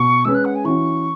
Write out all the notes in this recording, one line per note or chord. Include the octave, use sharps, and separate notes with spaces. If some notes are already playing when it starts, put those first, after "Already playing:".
Already playing: B2 C#6
G#3 C#4 G#4 B4 E6
F#6
F#5
G#5
E3 C#4 F#4 C#6